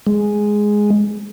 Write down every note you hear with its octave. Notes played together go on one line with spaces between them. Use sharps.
G#3